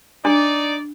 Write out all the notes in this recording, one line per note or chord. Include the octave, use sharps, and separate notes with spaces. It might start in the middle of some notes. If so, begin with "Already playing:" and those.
D4 D#4 D5